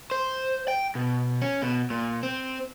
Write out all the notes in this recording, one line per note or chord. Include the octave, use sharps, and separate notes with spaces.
C5
G5
B2
C#4
B2
A#2
C4